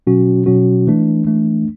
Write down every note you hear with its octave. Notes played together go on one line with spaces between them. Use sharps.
B2 F#3 C#4 F#4
B2 F#3 C#4 F#4
E3 A3 D4
E3 A3 D4